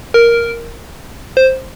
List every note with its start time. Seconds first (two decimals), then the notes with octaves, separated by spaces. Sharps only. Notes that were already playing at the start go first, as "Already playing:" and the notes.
0.14 A#4
1.37 C5